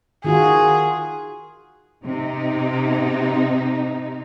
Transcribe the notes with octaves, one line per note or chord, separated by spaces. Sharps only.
D#3 F4 F#4 G#4
C3 D#4